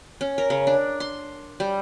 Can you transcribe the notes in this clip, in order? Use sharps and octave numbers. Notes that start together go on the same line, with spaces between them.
C#4
A#4
C#3
D4
C6
G3